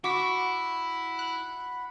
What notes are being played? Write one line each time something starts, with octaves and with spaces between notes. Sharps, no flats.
E4 F#4 F#5 B5 C#6 D6 B6
F#6